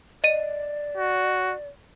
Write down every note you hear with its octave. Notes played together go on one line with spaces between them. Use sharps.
D5 D#5 D#7
F#4